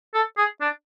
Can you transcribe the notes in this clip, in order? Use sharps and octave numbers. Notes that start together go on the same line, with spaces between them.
A4
G#4
D4